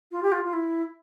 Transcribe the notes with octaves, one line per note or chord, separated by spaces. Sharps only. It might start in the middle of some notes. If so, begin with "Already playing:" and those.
F4
G4
F4
F4
E4